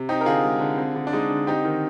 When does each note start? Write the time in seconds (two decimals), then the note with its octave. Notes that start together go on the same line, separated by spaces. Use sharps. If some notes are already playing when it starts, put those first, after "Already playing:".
Already playing: C3
0.09 C4 D#4 G4
0.21 A#4
0.26 D3 F4 G#4
0.44 G#3
0.61 D3
0.78 C4
0.96 D3
1.07 D4
1.13 G#3 D#4
1.30 D3
1.47 C4 D#4 G4
1.65 D#3